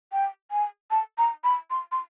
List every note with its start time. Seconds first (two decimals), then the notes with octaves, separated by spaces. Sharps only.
0.12 G5
0.51 G#5
0.91 A5
1.18 A#5
1.44 B5
1.70 C6
1.92 C6